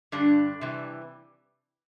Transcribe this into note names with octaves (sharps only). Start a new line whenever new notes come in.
G2 D3 G3 D4
C3 E3 G3